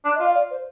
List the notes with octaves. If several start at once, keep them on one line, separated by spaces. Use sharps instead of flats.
D4
D#5
F4
F5
D5
C5